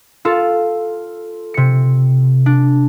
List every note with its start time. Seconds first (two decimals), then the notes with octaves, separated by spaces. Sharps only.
0.25 F4 A4
1.54 C3 C#7
2.46 D4